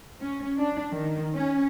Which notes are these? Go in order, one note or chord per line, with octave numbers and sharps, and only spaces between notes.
C#4
D4
D#3
C#4